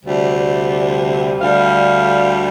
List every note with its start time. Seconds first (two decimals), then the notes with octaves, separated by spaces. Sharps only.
0.03 D2 C3 G3 D5
1.39 D2 D3 G3 F5